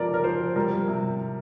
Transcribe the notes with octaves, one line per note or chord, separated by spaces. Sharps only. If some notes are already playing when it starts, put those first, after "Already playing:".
Already playing: C3 F3 A#4 D5
A#4
F3 C5
G3 A#4
C3